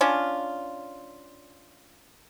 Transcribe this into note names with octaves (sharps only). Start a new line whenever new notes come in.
C#4 D4 F4